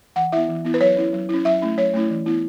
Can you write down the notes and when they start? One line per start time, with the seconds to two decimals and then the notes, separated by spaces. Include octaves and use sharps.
0.16 E3 F#5
0.32 B3 E4 E5
0.49 E3
0.65 B3 E4
0.74 B4
0.81 F#3 C#5
0.97 C#4 E4
1.13 F#3
1.29 C#4 E4
1.45 F#3 E5
1.61 A3 C#4 E4
1.78 F#3 C#5
1.94 A3 C#4 E4
2.10 E3
2.26 B3 E4